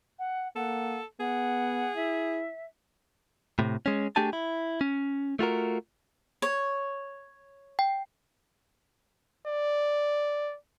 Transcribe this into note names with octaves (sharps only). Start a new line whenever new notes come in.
F#5
A#3 A4 F#5
B3 G#4 F#5
E4 E5
A2 C3
G#3 C#4
A3 D4 G4 G#4 G#5 A5
E4
C#4
A3 F4 F#4 A#4
C#5
G5
D5